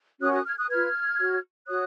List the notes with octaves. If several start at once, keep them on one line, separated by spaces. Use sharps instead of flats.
C#4 F#4 A#4 C#5 D#6 F#6
D#6 F#6
F6 G#6
D#6 F#6
F4 B4 F6 G#6
F#4 C#5
F#4 C#5 D#6 F#6